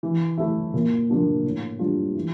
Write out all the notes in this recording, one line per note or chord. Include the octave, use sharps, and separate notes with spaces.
E3
A3 E4
A#2
F3 A#3 D4 F4
A2
G3 D4 F4
E3